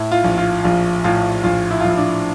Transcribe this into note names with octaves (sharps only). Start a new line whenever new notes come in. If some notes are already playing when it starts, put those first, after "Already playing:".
Already playing: A2 E4
F4
A#1
F4
A#1 F4
A2 F4
A#1 F4
E4
F4
A#1
E4
D4